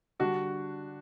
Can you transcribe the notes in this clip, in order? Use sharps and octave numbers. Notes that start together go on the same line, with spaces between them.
D3 G3 D4 F#4